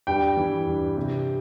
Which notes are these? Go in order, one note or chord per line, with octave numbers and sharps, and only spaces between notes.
G2 G5
E3
G2
C3